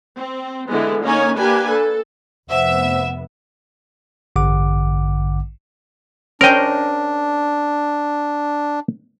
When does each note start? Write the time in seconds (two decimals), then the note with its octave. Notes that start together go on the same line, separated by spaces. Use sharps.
0.17 C4
0.69 D3 E3 G#3 B3 E4
1.03 A#3 C#4 D#4 C#5 G#5
1.38 A#3 D4 G4 B4 G#5
1.69 A4
2.50 F1 B3 C5 E5 F#5 E6
4.36 A1 G2 D3 F#5 D6
6.41 C#4 D4 A#4 C5 D#5 G5